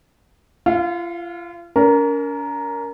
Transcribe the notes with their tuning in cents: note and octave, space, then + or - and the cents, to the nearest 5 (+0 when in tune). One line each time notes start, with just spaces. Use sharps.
F4 -35 F5 +30
C#4 +45 A#4 +0